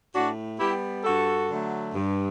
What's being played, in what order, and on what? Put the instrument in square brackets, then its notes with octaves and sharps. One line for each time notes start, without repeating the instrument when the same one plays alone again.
[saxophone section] A2 D4 F#4
G3 B3 E4 G4
G2 F#4 A4
D3 F#3 A3
G2